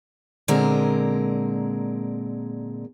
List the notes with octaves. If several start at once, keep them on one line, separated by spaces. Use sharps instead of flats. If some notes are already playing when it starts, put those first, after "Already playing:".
A#2 D3 G#3 C4 A#4